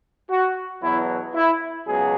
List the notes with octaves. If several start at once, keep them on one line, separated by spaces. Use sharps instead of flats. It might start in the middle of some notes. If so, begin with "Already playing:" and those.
F#4
E2 B2 F#3 E4
E4
C#2 B2 F#3 G#4